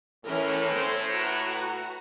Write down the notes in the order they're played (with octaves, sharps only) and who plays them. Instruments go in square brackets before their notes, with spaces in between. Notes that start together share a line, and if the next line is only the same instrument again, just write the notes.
[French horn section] A2 [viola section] E3 C#4 A#4
[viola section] C#4 A4 C5
F#4 B4 A#5